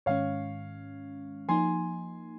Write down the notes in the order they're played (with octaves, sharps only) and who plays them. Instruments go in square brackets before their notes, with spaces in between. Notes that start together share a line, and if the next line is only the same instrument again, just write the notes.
[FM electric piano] G#2 D#3 G#3 C#4 [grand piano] C#5 F5
[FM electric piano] F3 A#3 D#4 [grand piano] G#5 C6